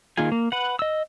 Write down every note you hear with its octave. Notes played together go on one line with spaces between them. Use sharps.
D#3 A#3 F4 G#4 G#5
A#3
B4 F#5
D#5 E6